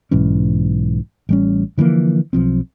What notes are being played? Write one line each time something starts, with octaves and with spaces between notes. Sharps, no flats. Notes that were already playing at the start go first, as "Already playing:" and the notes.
B1 G#2 E3 C#4
A1 G3 C#4
D3 E3 F3 A#3
B1 F3 C4